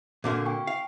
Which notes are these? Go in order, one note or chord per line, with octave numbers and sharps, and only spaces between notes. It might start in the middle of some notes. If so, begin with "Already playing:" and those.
A#2 D3 A#3 C4 F#4 F5
G5 G#5 C#6
F5